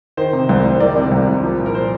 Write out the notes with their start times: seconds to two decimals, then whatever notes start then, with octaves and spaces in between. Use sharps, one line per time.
0.17 D#3 C5
0.33 C3
0.49 C2 C5
0.64 C2
0.80 D#3 D5
0.96 C3
1.12 C2
1.27 C2
1.43 F3
1.59 A#2
1.66 A#4
1.75 C5